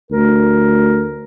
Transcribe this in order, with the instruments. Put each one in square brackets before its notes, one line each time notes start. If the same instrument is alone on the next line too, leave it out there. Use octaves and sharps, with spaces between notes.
[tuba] D2 [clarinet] A#4